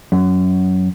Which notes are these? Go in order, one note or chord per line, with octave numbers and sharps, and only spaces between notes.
F#2